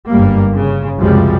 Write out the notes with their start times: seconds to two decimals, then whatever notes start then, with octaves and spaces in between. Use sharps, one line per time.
0.10 G1 F#2 G3 A#3
0.55 C#3
1.01 C#2 F#2 C3 F3 G3 G#3